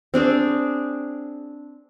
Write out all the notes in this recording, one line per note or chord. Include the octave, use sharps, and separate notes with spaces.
C4 D4 G#4